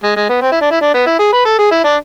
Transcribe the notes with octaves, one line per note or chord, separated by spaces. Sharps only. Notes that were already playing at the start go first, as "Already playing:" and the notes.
G#3
G#3
B3
C4
E4
D4
E4
D4
B3
E4
G#4
B4
A4
G#4
E4
D4